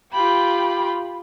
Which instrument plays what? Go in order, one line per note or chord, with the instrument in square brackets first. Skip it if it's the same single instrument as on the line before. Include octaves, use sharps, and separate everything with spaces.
[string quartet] F4 G4 G5 B5